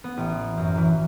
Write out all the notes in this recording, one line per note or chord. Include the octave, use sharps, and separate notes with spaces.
B3
A1
F#2
E3